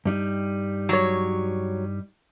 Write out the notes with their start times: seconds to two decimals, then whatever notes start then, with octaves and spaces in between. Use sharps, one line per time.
0.06 G2 G3 D#4
0.89 F#3 C#5